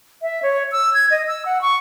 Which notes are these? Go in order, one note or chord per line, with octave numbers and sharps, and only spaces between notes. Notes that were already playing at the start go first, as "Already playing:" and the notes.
E5
C#5
E6
G#6
D#5
E6
F#5
C#6